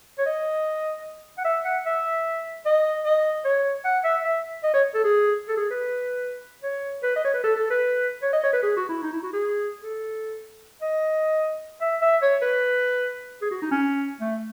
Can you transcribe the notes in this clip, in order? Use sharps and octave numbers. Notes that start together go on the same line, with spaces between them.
C#5
D#5
F#5
E5
F#5
E5
D#5
D#5
C#5
F#5
E5
E5
D#5
C#5
A4
G#4
A4
G#4
B4
C#5
B4
D#5
C#5
B4
A4
A4
B4
C#5
D#5
C#5
B4
G#4
F#4
E4
D#4
E4
F#4
G#4
A4
D#5
E5
E5
C#5
B4
G#4
F#4
D#4
C#4
A3